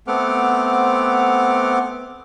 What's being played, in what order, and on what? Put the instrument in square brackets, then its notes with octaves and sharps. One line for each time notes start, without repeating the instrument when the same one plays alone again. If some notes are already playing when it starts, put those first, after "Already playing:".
[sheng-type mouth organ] A3 B3 C4 F#5 D6 F6